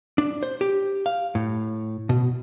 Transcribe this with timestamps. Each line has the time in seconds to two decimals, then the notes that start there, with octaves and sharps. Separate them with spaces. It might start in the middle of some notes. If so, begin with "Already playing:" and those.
0.18 D4
0.43 C5
0.61 G4
1.06 F5
1.35 A2
2.09 B2